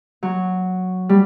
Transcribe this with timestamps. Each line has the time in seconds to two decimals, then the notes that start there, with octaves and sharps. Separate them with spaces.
0.23 F#3
1.09 G3